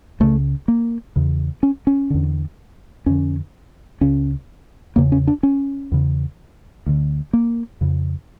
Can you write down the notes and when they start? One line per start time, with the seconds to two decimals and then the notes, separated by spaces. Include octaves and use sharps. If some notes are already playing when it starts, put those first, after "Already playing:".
0.20 C#2 C#3 A3
0.68 A#3
1.16 E2 C#3
1.63 C#4
1.87 C#4
2.10 E2 D3
3.06 F2 D3 C#4
4.01 C#2 C#3 C#4
4.96 E2 C#3 A#3
5.12 C#4
5.27 D4
5.43 C#4
5.92 E2 C#3
6.86 D2 D3
7.33 A#3
7.81 F2 C#3